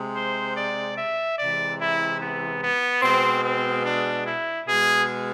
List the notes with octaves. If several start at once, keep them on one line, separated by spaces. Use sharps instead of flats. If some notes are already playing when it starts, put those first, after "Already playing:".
Already playing: C3 G#3
C5
D5
E5
C3 E3 G#3 D5
E4
B3
B3
B2 G#3 C4
C4
D4
E4
B2 G#3 G#4